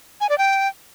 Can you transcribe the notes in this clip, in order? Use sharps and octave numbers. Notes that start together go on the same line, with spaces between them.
G#5
D5
G5